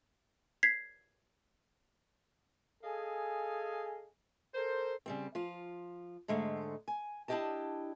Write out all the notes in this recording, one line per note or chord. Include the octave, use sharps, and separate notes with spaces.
G#6 B6 C7
G#4 A4 D#5 F5 G#5
A4 A#4 C5
C#3 G3 C4
F3 F4
G#2 D3 G#3 A3
G#5
D4 E4 F4 G4 D#5 A5